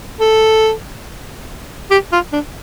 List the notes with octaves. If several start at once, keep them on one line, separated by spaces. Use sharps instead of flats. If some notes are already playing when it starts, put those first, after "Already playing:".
A4
G4
F4
D4